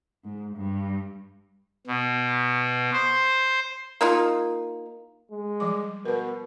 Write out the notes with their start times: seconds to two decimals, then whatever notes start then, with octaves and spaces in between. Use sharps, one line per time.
0.24 G#2
0.56 G2
1.87 B2
2.93 C5
4.01 A#3 D#4 F4
5.31 G#3
5.60 F3 G3 D6
6.05 B2 A#4 B4